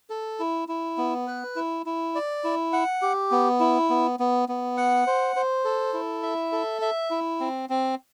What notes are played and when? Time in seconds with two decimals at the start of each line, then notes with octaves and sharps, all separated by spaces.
0.10 A4
0.40 E4
0.68 E4
0.98 B3
1.27 B4
1.56 E4
1.86 E4
2.15 D5
2.44 E4
2.73 F#5
3.02 G4
3.31 B3
3.60 E4
3.90 B3
4.20 B3
4.49 B3
4.77 F#5
5.07 C5
5.36 C5
5.65 A4
5.94 E4
6.23 E5
6.52 A4
6.82 E5
7.11 E4
7.40 C4
7.70 C4